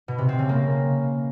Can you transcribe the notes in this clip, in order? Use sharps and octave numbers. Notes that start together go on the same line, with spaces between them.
B2
C3
C4
C#3
A#3